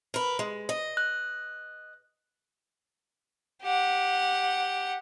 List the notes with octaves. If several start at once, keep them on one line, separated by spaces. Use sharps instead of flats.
A#4 B4
G#3
D#5
F#6
G4 F#5